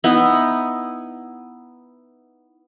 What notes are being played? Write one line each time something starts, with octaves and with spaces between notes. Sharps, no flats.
B3 D#4 E4 B4